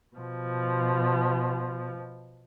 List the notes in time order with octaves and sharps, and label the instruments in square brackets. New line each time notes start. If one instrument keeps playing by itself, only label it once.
[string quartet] B2 F3